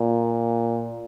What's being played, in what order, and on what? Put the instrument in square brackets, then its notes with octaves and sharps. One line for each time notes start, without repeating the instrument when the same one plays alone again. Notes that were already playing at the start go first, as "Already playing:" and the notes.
Already playing: [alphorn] A#2